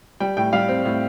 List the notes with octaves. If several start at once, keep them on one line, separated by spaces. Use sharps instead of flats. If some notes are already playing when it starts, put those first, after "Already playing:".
G3 G5
A2 G5
G3 F5
C4
A2